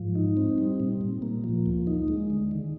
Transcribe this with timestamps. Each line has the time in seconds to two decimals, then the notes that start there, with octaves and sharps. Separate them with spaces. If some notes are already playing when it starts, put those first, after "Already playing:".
Already playing: G#2 F3
0.15 D#4
0.37 C4
0.58 G3
0.80 A#2
1.01 A#2
1.22 A#3
1.44 F3
1.66 D2
1.87 D#4
2.08 G#3
2.30 D3
2.51 D#3